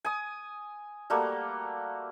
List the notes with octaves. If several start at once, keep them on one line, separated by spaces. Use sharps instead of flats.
G#5 D#6
G3 A3 A#3 F#4